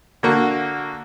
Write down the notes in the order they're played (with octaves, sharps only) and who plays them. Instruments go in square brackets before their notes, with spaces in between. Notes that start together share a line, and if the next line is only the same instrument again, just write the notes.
[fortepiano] D3 A#3 F#4